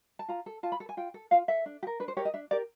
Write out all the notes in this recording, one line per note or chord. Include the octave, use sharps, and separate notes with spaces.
A5
F4 A#5
A4
F4 A5
B5
A4
G#5
F4 G5
A4
F4 F5
A4 E5
D4
G4
A#4
D4 B4
C5
G4 A#4 C#5
D#5
D4 E5
G4 A#4 D5